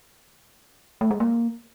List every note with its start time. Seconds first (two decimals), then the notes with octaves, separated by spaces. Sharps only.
1.01 A3
1.11 G#3
1.20 A#3